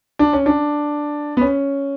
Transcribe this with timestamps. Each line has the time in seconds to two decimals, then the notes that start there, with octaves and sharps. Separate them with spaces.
0.19 D4
0.33 C#4
0.46 D4
1.37 B3
1.41 C#4